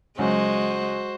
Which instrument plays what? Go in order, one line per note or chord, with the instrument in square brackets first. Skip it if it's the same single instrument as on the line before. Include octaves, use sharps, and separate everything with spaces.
[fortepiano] C#2 F#3 C#4 [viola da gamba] G#3 [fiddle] F#4 C5